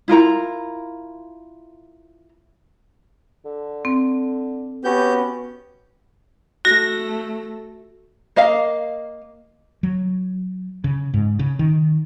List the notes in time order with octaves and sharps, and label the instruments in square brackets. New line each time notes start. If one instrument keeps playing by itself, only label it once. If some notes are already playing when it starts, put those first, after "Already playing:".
[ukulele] E4 F4 A#4 A#5
[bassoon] D3
[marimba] C4
[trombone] B3 [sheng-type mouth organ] C#4 G4 G6 [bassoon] F#4
[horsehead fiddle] A3 [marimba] F#4 [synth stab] A#6
[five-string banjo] A#3 D#5 F5
[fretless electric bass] F#3
C#3
G#2
C#3
D#3